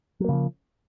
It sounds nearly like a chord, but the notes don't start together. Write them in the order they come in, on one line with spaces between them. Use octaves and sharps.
F#3 A#3 C#3 F3